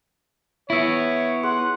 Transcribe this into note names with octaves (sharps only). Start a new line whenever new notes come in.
B3 E4 C#5 E5 E6
G#4 F#5 C6